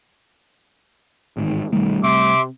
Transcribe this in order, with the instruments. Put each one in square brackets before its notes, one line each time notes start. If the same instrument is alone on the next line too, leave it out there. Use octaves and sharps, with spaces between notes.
[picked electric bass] A1 G#2 D#3
[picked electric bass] B1 D#3 [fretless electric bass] G3 A3
[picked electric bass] C3 [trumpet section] E5 C6 D6